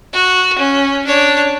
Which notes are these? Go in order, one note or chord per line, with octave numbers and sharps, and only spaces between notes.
F#4
C#4
D4 C#5